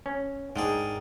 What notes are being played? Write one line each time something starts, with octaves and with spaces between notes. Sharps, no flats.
C#4
G#2 D#3 D4 G#4